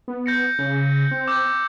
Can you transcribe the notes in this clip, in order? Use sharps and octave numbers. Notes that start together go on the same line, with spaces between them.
B3
G6 A#6 C#7
C#3
C4
D6 E6 G6